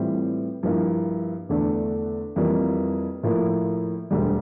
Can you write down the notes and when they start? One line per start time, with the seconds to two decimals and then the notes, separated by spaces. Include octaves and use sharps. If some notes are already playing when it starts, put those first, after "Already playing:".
Already playing: A2 E3 G3 C4 F4
0.63 G2 F3 A#3 E4
1.49 E2 D3 A3 D4
2.36 F2 E3 G3 A#3 F4
3.23 A2 F3 A#3 E4
4.11 E1 D2 D3 G3